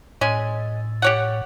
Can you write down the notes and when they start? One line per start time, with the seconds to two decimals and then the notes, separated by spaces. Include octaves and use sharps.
0.21 A2 G#3 C#4 G#5
1.02 G4 C#5 F#5